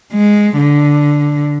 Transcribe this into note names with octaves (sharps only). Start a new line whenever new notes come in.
G#3
D3